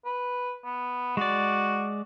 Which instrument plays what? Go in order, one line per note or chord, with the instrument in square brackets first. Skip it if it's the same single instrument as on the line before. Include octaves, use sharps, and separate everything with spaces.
[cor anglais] B4
B3
[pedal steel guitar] G#3 D5 [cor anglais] F#4